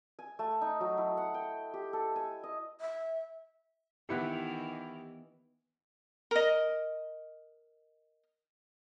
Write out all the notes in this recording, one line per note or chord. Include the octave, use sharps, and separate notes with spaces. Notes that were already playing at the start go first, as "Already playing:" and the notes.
G#5
A3
D#4
F#3
E4
F#5
G5
G4
A4
G#5
D#5
E5
D#3 E3 B3 E4 G4 C#7
A#4 D#5